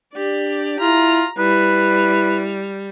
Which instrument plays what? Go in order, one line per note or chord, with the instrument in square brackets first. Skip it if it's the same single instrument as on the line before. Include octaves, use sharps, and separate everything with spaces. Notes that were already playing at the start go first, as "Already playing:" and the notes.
[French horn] D4 [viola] G4 D5
[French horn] E4 [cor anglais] F4 [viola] A#5
[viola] G3 [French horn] E4 [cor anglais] B4